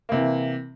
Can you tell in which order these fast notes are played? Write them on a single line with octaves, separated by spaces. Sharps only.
A#3 C3 E3